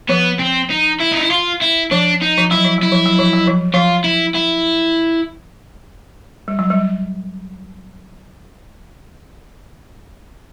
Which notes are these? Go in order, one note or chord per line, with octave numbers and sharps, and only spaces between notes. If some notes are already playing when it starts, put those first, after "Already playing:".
F3 B3
C4
D#4
E4
D#4
E4
F4
E4
F3 D4
D#4
F3
F#3 E4
F3
F#3 E4
F3
F#3
F3
F#3
F3
F3 F4
E4
E4
G3
F#3
G3